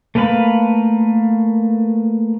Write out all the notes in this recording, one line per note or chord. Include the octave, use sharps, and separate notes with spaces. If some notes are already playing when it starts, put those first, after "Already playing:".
A3 A#3 B4 F5 B5